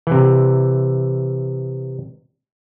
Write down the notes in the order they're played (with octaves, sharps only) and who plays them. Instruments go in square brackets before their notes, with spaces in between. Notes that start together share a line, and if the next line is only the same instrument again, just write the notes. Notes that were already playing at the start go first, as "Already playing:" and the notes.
[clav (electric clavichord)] C3 E3